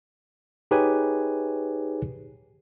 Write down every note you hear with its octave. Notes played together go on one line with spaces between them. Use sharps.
D#4 G4 G#4 B4 C#5 G#5